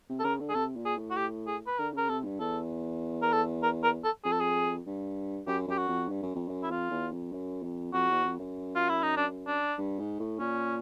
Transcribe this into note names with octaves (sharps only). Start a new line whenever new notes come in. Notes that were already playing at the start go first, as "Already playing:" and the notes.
C3
A4
C#3 A#4
D3
G#4
C3 A4
A#2
G#4
A2
F#4
G4
G#4
B4
D3 A#4
C#3 A#4
C3 A4
G2
E2 A4
A#4
A4
A#4
A#4
A4
F2 G#4
A4
G#4
G2
F#2 G4
F#2 G4
F#4
F2
G2
F#2
F2
F#2
E4
F2 F4
E2
F2
F#2
F2
F2 F#4
E2
F2
F#2
F4
E4
D#4
D4
D4
G2
G#2
A2
A#2 C#4